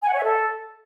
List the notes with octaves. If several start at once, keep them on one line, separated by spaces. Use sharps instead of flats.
G#5
F#5
C#5
E5
A4